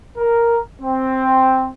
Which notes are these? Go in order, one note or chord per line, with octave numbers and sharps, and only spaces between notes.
A#4
C4